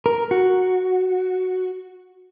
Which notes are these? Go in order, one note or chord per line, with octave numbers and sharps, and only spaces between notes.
A#4
F#4